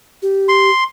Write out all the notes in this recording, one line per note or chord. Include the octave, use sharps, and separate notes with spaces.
G4
C6